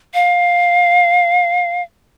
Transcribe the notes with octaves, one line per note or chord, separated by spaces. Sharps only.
F5